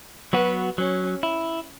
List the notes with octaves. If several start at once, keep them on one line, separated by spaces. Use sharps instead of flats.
F#3 B3 F#4 B4
F#3 C#4
E4